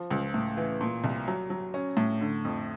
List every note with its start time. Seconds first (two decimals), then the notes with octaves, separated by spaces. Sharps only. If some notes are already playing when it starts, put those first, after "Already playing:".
Already playing: F3
0.11 C#2
0.34 A2
0.57 E3
0.81 A#2
1.04 C2
1.28 F#3
1.50 F#3
1.74 C#4
1.97 A2
2.21 D3
2.45 F2